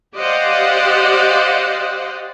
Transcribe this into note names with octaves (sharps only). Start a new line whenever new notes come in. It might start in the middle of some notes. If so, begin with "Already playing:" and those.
G4 C5 D5 D#5 F5 F#5